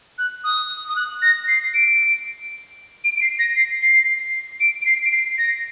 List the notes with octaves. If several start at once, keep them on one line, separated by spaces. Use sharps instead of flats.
F#6
D#6
D#6
F#6
A#6
C7
D7
D7
D7
C7
A#6
C7
C7
D7
D7
C7
D7
C7
A#6